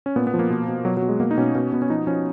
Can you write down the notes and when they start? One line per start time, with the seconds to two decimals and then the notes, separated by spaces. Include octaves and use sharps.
0.06 C#4
0.16 A#2 B3
0.27 B3
0.34 F3
0.39 A#3
0.50 B2
0.68 B2
0.85 B2 F#3
0.97 F#3
1.02 B2
1.09 G#3
1.20 B2 A#3
1.31 D#4
1.37 B2 C#4
1.55 B2
1.73 B2 B3
1.82 C#4
1.90 F3 D#4
2.07 F3 C#4